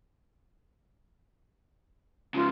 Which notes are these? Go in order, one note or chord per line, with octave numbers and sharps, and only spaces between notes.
G#2 C#3 F4